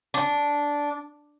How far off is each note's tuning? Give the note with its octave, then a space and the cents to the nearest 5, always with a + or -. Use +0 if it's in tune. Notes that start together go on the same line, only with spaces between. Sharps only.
D4 -10